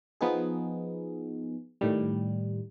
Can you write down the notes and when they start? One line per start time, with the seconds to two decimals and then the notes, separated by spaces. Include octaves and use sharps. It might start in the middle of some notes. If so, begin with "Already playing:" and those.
0.21 F3 B3 D#4 G#4
1.81 A2 D#3 G3